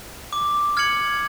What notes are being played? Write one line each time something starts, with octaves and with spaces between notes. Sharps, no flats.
D6
F6 G#6 C#7 F#7